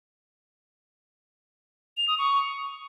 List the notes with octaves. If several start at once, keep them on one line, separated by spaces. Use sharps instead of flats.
F7
D#6
C#6